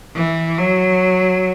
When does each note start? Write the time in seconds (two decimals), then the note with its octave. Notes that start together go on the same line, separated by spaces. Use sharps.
0.16 E3
0.58 F#3